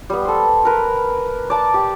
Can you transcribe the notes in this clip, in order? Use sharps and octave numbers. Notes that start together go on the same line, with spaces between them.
G3 B3
A4 C5
A#4 B4
D5 A5 D6
G4